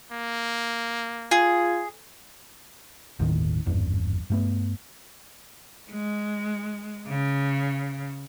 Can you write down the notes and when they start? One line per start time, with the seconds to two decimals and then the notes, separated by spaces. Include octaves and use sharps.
0.12 A#3
1.31 F4 G#4
3.19 G1 D#2 A2 D#3
3.66 G#1 E2 G2
4.30 G2 A3 B3
5.91 G#3
7.08 C#3